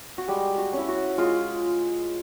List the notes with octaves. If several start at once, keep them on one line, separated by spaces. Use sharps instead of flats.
F#4
G3 G#3 G4
F#4
C#4 E4
F#4
G#3 F4